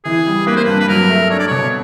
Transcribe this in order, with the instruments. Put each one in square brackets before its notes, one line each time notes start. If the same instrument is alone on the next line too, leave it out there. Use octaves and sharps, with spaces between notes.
[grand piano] E3 [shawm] G#4
[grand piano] G3
[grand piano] A#3 [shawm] B4
[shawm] C5
[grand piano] G2 [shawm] B4
[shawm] B4
[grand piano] F#3 [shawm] A#4
[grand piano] A3
[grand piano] D4 [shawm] C#5
[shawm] D5
[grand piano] B2 [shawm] C#5